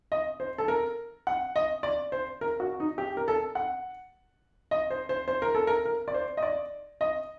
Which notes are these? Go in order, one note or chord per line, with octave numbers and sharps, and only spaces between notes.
D#5
C5
A4
A#4
F#5
D#5
D5
C5
A#4
F#4
D#4
G4
A#4
A4
F#5
D#5
C5
C5
C5
A#4
A4
A#4
A#4
D5
C5
D#5
D5
D#5